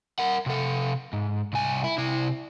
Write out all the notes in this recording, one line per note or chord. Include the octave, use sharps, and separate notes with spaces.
A#4 F#5
C3 A4
G#2
C2 G#5
E4
C3 E4